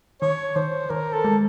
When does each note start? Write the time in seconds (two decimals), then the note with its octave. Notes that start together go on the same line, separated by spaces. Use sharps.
0.22 D#3 C#5
0.56 D#3 C5
0.90 D#3 A#4
1.13 A4
1.24 G#3